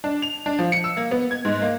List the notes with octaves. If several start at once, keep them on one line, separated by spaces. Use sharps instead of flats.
D4
F7
D4
F3
C#7
E6
A#3
B3
G#6
G#2
A#3